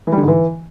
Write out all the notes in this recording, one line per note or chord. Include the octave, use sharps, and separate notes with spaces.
E3
G3
D3
G#2
E3